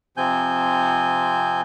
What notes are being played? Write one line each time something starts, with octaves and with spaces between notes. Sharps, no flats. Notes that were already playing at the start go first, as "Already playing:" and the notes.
C3 F3 C4 G#5 G6